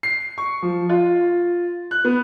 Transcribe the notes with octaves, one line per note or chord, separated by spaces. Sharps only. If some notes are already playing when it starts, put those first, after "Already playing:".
C7
C#6
F3
F4
F#6
B3